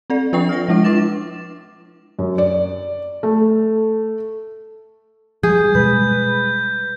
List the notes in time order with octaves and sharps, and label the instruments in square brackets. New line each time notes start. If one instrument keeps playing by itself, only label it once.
[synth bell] C4 A4 D5
F3 F4 B4 G5 C#6 C7
F6 A#6
F3 G#3 E4 E5
D4 D6 A6 E7
[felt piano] F#2
D5
A3
[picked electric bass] F3 G3 [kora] G#4 [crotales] G6
[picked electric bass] B2 G3 G#3 [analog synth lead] B4 [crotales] G6